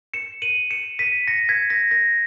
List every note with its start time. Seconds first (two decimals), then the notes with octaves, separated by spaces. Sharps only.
0.14 C#7 E7
0.42 D#7 F#7
0.71 C#7 E7
0.99 B6 D#7
1.27 A#6 C#7
1.49 G#6 B6
1.70 A#6
1.91 A#6